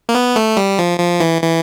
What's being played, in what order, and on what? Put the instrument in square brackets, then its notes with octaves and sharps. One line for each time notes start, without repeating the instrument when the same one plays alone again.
[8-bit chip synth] A#3
B3
A3
G3
F3
F3
E3
E3